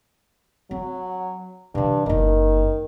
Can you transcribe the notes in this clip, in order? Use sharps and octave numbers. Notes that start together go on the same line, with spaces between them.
F#3 C4
G2 C3 E3
F#1 D#3 D#4